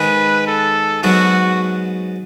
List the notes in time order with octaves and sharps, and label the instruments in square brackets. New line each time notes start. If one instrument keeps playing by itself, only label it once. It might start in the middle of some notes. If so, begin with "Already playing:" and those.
Already playing: [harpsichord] G#2 D#3 G#3 [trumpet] B4
[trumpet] A4
[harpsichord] G#2 F#3 B3 [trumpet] F#4